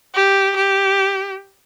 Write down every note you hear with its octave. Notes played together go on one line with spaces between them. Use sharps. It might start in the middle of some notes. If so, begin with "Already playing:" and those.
G4
G4